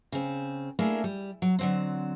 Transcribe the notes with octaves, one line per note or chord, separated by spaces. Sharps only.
C#3 C4
A3 A#3 D4 E4 G#4 A#4
G3
F#3
D3 F#3 C4